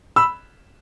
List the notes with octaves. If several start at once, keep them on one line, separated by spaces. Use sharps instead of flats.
B5 E6